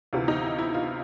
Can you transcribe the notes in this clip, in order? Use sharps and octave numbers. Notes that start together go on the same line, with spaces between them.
D2 C3 E3 F4
D#4
E4
E4
F4